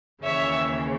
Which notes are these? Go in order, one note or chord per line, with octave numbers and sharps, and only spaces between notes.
D#2 C#3 E3 C#5 E5